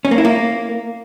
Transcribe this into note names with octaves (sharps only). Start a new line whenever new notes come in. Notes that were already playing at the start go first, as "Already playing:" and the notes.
C#4
A#3
E4
A#3